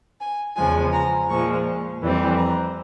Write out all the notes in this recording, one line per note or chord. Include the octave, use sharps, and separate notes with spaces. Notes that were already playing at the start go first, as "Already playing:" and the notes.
G#5
E2 C#3 F3 G#3 G#5
A#5
A#2 F3 G#3 C#6
F2 E3 G3 C4
A#5